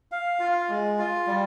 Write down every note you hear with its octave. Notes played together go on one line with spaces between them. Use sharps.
F5
F4
G#3
F4
G3